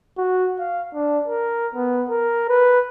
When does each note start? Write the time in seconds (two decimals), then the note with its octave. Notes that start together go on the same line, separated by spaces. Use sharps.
0.18 F#4
0.59 F5
0.94 D4
1.28 A#4
1.75 B3
2.09 A#4
2.49 B4